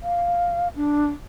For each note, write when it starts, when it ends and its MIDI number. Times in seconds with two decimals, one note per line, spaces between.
0.01 0.68 77
0.76 1.07 62